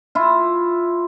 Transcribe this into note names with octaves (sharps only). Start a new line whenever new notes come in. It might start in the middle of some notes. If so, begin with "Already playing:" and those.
E4 F4